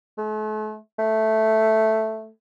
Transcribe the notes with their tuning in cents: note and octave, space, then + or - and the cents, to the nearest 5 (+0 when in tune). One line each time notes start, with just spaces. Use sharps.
A3 -40
A3 +0